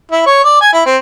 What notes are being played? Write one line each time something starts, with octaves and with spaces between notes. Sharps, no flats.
E4
C#5
D5
G#5
E4
C4